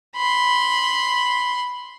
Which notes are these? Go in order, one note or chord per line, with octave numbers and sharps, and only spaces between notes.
B5 C6